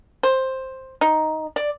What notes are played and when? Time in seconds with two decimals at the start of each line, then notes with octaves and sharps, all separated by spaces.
0.23 C5
1.01 D#4
1.56 D5